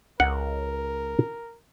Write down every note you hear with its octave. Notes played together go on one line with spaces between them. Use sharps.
C#2 A#4 F#5